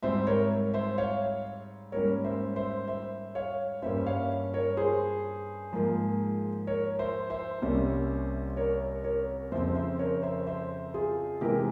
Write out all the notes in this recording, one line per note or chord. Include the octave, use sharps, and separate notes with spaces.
G#2 G3 C4 C5 E5
A#4 C#5
C5 E5
C#5 F5
G#2 G3 A#3 C#4 A#4 C#5
C5 E5
C5 E5
C5 E5
C#5 F5
G2 G3 A#3 C#4 C5 E5
C#5 F5
A#4 C#5
G#4 C5
G#2 F3 A#3
A#4 C#5
C5 E5
C5 E5
C2 C3 G3 A#3 C#4
A#4 C#5
A#4 C#5
F2 C#3 F3 C4 C5 E5
C5 E5
A#4 C#5
C5 E5
C5 E5
F4 G#4
C3 E3 G#3 C4 G4 A#4